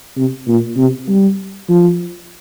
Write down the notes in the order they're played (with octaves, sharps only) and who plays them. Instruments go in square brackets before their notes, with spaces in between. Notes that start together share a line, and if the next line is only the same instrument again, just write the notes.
[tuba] C3
A#2
C3
G3
F3